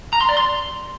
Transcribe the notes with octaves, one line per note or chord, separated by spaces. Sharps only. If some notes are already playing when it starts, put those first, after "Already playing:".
A#5
C6
D5
C6